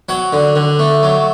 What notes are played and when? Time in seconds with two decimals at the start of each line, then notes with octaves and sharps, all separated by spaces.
0.09 F#3 F#5
0.33 D3
0.56 D3
0.79 A3
1.03 F#3